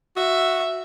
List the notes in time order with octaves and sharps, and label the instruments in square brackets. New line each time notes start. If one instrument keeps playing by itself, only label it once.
[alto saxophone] F#4 [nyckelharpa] E5